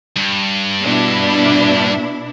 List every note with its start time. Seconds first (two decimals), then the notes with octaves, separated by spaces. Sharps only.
0.17 G2
0.83 B2 D4 E4